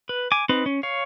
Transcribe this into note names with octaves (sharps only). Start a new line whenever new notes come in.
B4
G#5 D6
C4 D#4 B4
C#4
C#5 F5